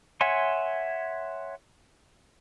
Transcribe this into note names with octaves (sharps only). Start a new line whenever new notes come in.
C#5 E5 F#5 G#5 C6